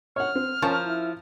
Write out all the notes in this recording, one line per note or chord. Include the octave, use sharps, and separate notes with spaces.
C#5 F#5 F6
C4
F3 C#4 A#4 A5 C#6
E4